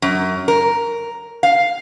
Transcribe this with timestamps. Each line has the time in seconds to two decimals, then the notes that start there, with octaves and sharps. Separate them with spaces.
0.02 F#2
0.48 A#4
1.43 F5